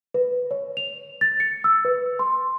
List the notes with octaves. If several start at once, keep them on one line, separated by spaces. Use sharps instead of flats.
B4
C#5
F7
A6
C#7
E6
B4
C6